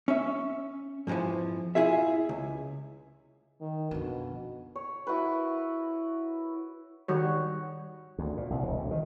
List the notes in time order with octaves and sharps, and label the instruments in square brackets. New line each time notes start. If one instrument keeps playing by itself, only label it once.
[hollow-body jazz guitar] C#4 E5
F2 G#2 C3 E3 F3
E4 F4 G#4 E5
C#2
[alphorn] D#3
[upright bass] F2 D3 [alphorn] B2
[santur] C#5
E4 F#4 A#4 B4
[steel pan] D#3 G3 F#4 C#5
[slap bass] D2
A#2
C2
E1
D2
D#3